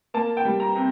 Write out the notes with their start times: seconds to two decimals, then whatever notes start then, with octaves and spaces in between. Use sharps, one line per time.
0.14 A#3 A5
0.37 G5
0.45 G3
0.60 A#5
0.75 C3